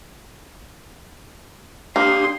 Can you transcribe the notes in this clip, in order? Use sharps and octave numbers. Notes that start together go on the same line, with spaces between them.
A#3 D4 G4 C6 D#6